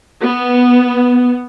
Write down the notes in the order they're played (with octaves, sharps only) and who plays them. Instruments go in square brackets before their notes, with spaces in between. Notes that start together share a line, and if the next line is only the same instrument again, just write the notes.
[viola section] B3